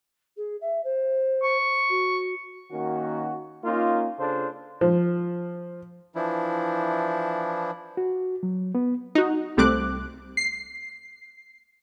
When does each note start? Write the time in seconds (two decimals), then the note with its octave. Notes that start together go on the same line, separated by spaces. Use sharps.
0.37 G#4
0.60 E5
0.84 C5
1.43 C#6
1.89 F#4
2.71 D#3 A#3 C#4 F#4
3.64 A#3 C#4 D#4 F4
4.18 C#3 D4 F4 A4 C5
4.81 F3
6.15 E3 F3 D4 E4
7.97 F#4
8.43 F#3
8.75 B3
9.15 D#4 F#4
9.57 C2 G3 A3 C4 D6 F#6
10.37 C7